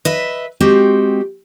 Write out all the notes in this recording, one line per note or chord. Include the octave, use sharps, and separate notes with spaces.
B4 D#5 E5
G#3 C4 F#4 G4